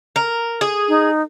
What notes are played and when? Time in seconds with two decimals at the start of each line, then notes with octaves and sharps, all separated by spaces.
0.16 A#4
0.61 G#4
0.89 D#4